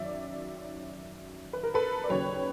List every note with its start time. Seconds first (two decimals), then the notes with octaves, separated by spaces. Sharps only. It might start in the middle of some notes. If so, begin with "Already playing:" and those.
Already playing: F#2 D#3 F#3 D5 E5
1.53 B4
1.63 A#4
1.74 A4 B4
2.04 D5
2.09 D#2 C#3 F#3 B4 C#5